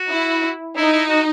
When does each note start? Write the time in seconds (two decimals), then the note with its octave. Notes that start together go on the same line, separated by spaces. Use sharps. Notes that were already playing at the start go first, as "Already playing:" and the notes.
Already playing: F#4
0.10 E4
0.76 D#4 E4
0.93 E4
1.10 F#4